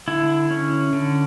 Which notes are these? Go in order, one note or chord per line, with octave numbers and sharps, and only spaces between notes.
D3 E4
C#4
D3